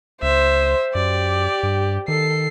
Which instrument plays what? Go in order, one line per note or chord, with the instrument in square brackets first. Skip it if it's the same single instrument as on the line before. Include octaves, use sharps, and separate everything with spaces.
[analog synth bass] C#2 [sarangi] C5 [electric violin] E5
[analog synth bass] F#2 [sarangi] G4 [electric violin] D5
[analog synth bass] G2
[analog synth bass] D#3 [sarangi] A4 [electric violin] C7